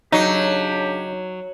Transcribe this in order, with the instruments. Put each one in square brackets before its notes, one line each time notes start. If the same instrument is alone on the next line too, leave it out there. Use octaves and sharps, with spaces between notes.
[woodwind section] C#3 D4 G4 [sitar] F#3 [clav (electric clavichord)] D#4